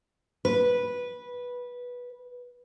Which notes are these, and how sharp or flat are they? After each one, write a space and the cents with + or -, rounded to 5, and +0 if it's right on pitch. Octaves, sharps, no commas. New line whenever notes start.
B4 -10